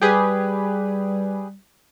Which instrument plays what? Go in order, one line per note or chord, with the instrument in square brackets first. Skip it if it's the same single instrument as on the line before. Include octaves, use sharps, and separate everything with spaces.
[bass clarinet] G3 [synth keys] G4 G#4 B4